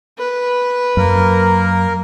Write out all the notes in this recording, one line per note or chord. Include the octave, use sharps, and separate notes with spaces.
B4
F#2 A#3 A#4